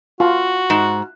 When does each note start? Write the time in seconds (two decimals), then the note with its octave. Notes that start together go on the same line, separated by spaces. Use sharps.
0.20 F4 F#4
0.70 G#2